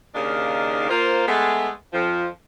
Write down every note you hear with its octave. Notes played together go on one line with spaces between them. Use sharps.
D#2 C#3 D4 D#4 D#5 F5
A#3 F4 C5
G#3 A3 B3
F2 F3